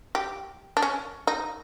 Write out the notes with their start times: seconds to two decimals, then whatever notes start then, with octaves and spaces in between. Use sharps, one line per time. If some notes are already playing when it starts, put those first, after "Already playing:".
0.15 G4
0.77 D4
0.82 C#4
1.27 D#4